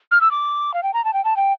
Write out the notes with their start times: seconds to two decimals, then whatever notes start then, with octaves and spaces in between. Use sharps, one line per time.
0.11 F6
0.21 E6
0.31 D6
0.74 F5
0.83 G5
0.94 A#5
1.05 A5
1.13 G5
1.25 A5
1.36 G5